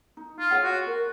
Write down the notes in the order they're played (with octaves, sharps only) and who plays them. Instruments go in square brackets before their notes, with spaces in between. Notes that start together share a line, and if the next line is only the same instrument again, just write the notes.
[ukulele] D#4
[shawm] F4
[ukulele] G#4 C#5 F#5
[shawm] F#4
[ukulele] A#4